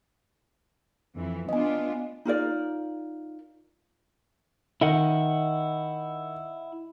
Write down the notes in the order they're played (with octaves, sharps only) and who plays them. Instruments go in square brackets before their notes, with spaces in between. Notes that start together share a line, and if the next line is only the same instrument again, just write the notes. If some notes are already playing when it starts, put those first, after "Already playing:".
[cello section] F2 E3
[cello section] B3 D4 F4 [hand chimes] D#5 G#5
[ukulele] D#4 F4 A#4 D5
[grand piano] D#3 [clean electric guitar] E4 D#5 F#5